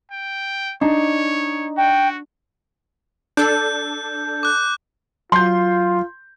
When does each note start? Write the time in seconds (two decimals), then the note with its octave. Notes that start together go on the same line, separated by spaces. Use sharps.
0.11 G5
0.81 D4 D#4 C#5
1.77 F#4 G5
3.37 D4 A4 G6
4.43 D6 F#6
5.32 F#3 F4 C6 G6